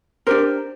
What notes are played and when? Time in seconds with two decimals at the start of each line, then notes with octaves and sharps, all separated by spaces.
0.27 D4 G4 A#4 C5